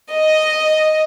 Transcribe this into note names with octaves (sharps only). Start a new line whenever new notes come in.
D#5